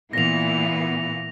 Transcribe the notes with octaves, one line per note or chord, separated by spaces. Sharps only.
A#2 E3 B3 A#6 F7